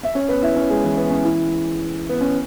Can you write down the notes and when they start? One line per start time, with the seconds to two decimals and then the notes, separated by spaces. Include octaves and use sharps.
0.03 E5
0.15 C#4 C#5
0.29 B3 B4
0.42 E4 E5
0.56 C#4 C#5
0.70 G#3 G#4
0.84 E3 E4
0.97 B3
1.11 C#4
1.25 E3 E4
2.09 B3
2.21 C#4